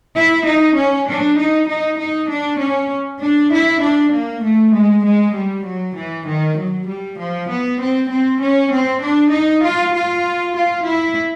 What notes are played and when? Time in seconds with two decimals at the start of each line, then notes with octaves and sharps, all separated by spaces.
0.15 E4
0.46 D#4
0.76 C#4
1.07 D4
1.38 D#4
1.68 D#4
1.99 D#4
2.29 D4
2.60 C#4
3.21 D4
3.52 E4
3.82 D4
4.12 A#3
4.44 A3
4.74 G#3
5.05 G#3
5.35 G3
5.65 F#3
5.97 E3
6.28 D#3
6.58 F#3
6.88 G3
7.19 F3
7.50 B3
7.81 C4
8.11 C4
8.42 C#4
8.73 C4
9.02 D4
9.33 D#4
9.64 F4
9.95 F4
10.56 F4
10.86 E4